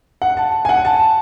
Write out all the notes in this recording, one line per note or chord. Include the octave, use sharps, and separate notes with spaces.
F#5
A5
G#5
F#5
A5